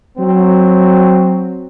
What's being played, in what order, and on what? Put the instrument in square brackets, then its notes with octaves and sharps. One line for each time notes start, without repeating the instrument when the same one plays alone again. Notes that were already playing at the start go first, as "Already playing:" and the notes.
[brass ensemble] F#3 C4